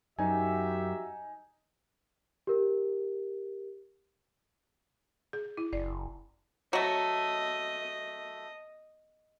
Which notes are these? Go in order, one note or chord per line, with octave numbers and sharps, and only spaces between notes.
F#2 D#4 F#4 G4 E5 G#5
G4 A#4
G#4
E4
F#1 D5
F#3 A3 D#5